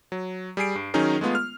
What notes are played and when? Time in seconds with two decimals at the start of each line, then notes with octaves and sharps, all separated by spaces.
0.12 F#3
0.57 G3 G#4 G#5 C7 D7
0.75 G2
0.94 D#3 F#3 C#4 D#4 G#4 A#4
1.21 G#3 A3 B3 F4
1.35 F6